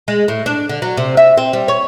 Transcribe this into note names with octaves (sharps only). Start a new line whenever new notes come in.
G#3
A2
D4
D3
F#3
C3
E5
C4
G3
C#5